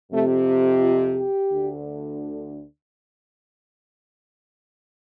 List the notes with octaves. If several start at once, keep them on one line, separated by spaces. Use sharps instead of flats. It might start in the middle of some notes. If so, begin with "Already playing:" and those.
F2 C3 A3
F4
G4
D2 D3